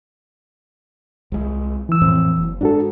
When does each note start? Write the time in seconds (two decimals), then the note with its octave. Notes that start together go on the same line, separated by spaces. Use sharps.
1.32 C2 G#3
1.89 E3 E6
2.01 F2 A2 C4
2.36 F#1
2.61 G#2 D4 F#4 A4